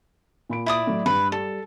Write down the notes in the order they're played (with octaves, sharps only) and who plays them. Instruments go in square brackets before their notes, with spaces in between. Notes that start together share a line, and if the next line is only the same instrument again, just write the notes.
[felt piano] A#2 B5 D7
[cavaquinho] E4 D5 D#6
[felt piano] A2 F#3
[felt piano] G2 [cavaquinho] B4
[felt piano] G3 [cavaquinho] A4